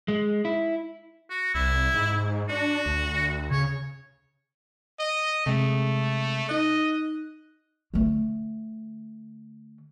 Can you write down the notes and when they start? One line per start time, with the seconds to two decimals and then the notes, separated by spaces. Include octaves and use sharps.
0.08 G#3
0.45 E4
1.31 F#4
1.55 C2 E4
1.94 G#2
2.49 D4 F#4
2.86 D2
3.51 C#3 C#5
4.99 D#5
5.46 C3 G#3 A3
6.49 D#4 D#5 F#6
7.94 D3 A3